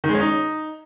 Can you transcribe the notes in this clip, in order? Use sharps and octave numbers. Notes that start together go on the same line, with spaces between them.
D#3
G#3
C#4
D#4